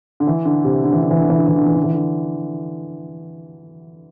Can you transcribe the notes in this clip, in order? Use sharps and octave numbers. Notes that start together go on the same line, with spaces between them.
D3
E3
D3
C3
D3
E3
D3
E3
D3
E3
D3
E3
D3
E3
D3
E3
D3